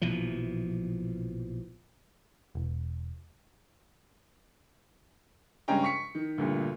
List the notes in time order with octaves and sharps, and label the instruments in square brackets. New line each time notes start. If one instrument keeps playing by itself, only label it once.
[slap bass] A#1 B2 E3 F3
[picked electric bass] E1
[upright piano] G2 C#3 G#3 C#4 G5 A#5
C#6 B6 C#7
D#3
D2 G2 A#2